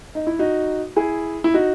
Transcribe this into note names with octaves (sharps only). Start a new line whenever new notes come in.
D#4
E4
D#4 F#4
E4 G#4
E4
D#4 F#4